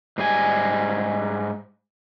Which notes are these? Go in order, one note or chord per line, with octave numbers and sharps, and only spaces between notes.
G#2 G3 G4 G#5